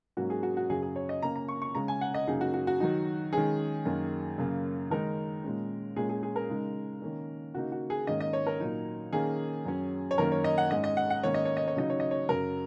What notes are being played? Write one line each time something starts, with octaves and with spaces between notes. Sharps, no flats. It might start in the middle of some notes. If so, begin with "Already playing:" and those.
G#2 F#3 A#3 C#4 F#4
G#4
F#4
F#4
F#2 C#3 F#3 G#4
G#4
C#5
D#5
C#3 A#3 C#4 A#5
A#5
C#6
C#6
C#3 G#3 C#4 A#5
G#5
F#5
D#5
F#2 C#3 F#3 A#3 D#4 G#4
F#4
F#4
F#4
D#3 F#3 D#4
D#3 G#3 C#4 G#4
F#2 D#3 A#3
F#2 C#3 A#3
D#3 G#3 D#4 A#4
A#2 G#3 C#4
A#2 G#3 C#4 G#4
G#4
G#4
A#4
C#3 G#3 D#4
D#3 A#3 C#4
C#3 A#3 D#4 F#4
F#4
G#4
G#2 D#3 A#3 C#4 D#5
D#5
C#5
A#4
A#2 F#3 D#4
D#3 A#3 C#4 G#4
F#2 F#3 C#4
C#5
F#2 D#3 A#3 C#4 A#4
C#5
D#5
F#5
G#2 G#3 C#4 D#5
D#5
F#5
F#5
G#2 D#3 A#3 C#4 C#5
D#5
C#5
D#5
C#5
C#3 F#3 D#4 D#5
C#5
D#5
C#5
F#2 C#3 F#3 A#4